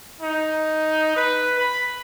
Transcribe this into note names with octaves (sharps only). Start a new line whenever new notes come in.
D#4
B4
B5